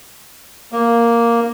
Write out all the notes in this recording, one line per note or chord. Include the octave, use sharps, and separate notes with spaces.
A#3